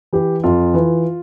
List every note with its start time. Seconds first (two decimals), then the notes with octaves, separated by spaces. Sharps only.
0.13 E3 G4
0.44 F2 F4
0.74 E3